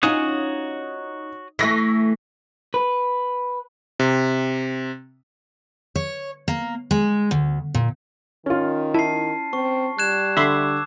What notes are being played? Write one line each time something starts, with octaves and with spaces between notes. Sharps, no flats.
C#4 D#4 F4 F#4 C#5 D#6
E3 A3 C#6 A#6 B6
B4
C3
C#5
A#3
G#3
D2
A#2
D#3 C#4 F4
E4 A5 C7
C4 C#6
G3 F#6 G#6 E7
D3 E5 B5 C6 D6 E6